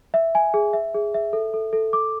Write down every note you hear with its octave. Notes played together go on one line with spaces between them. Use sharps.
E5
G#5
G#4
E5
G#4
E5
A4
A4
A4
D6